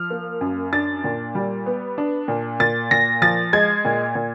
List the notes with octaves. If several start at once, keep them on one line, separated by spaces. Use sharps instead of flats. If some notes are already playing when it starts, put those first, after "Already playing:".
Already playing: F3 F6
A#3
F#2
D4 A6
A#2
G3
B3
D4
A#2
A#2 A6
A#2 A#6
F3 A6
G#3 G#6
A#2
A#2